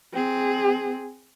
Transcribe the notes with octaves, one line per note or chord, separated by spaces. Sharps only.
C4 G#4